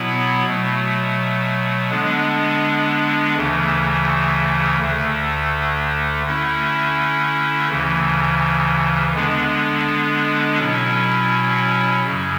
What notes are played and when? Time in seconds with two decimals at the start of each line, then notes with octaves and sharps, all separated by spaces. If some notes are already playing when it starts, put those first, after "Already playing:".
Already playing: B2 F#3 B3 E4
0.46 B2 F#3 A3
1.90 D3 G#3 B3 D4
3.36 D2 C#3 E3 A3
4.80 D2 D3 A3
6.24 D3 A3 C#4 E4
7.70 D2 C#3 E3
9.14 D3 G#3 B3 D4
10.59 B2 F#3 C#4 E4
12.04 F#2 C#3 F#3